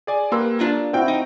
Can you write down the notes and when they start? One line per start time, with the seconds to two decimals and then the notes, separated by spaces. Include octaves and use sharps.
0.07 G#4 D5 G#5
0.32 A#3 G4 B4 C6 E6
0.59 D4 F4 A#4
0.93 C4 E4 F#4 F5 G5
1.08 D#4